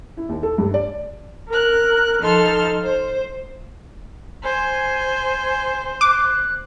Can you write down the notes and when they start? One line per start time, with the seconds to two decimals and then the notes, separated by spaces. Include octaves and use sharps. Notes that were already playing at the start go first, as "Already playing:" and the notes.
0.17 E4
0.29 D#2
0.43 A4
0.58 G2
0.74 D5
1.48 A#4 F#6
2.20 F3 D#4 A4 C6 F6
2.84 C5
4.44 C5 G#5
6.01 D6 F#6